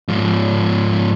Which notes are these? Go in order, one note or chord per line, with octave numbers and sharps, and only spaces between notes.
G#2 F3